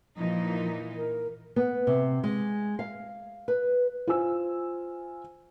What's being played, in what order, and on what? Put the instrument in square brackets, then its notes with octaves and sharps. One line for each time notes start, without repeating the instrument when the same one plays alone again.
[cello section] A#2 E3 D#4 [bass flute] F3
[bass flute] A#4
[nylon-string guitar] B3
C3
G#3
F5
B4
[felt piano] F4 C5 G#5 E6